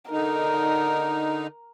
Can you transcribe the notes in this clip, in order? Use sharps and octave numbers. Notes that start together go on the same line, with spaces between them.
D3 D#4 A#4